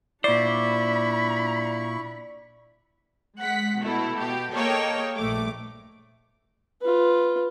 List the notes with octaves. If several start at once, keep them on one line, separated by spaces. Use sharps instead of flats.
A#2 D4 E4 C5 D5 B5 C#6
G#3 F#5 B6
B2 A3 E4
B2 G4
A#3 G#4 A4 C#5 D#5 G5
A#1 G2 A3 D6
F4 B4